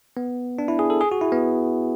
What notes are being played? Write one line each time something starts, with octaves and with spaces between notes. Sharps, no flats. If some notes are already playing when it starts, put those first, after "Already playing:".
B3
D4
E4
G#4
A4
G#4
F#4
E4
B3